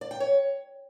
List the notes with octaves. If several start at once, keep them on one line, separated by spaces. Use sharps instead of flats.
D5
G5
C#5